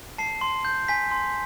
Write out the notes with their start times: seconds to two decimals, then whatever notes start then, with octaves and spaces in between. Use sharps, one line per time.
0.18 A5 C7
0.41 C6
0.65 G6
0.88 G#5 B6
1.12 C6